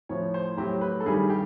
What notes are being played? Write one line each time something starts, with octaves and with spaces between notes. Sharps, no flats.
A2 F3 C#5
C5
A2 F#3 G4
B4
A4
G2 D#3 G3 G#4
G4